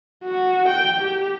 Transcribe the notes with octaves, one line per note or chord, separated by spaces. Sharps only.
F#4
G5
G4